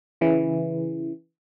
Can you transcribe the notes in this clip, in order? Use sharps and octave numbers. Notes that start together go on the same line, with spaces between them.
C#3 E3